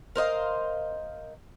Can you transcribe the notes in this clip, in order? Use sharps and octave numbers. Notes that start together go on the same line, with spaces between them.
A#4 C5 D#5 F5